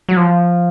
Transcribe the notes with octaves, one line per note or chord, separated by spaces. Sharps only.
F#3
F3